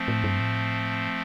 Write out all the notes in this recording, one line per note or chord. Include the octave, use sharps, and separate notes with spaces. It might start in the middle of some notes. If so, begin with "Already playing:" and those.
Already playing: F3 A3 C4
A2
G2
A2